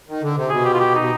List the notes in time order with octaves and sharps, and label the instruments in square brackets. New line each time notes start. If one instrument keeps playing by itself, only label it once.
[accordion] D#3
D3
C3
[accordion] B2 [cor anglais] G#4
[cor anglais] G4
F4
G4
[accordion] B2 [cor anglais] D#4